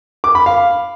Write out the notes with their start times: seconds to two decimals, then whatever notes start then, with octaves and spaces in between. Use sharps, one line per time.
0.24 D6
0.35 B5
0.46 F5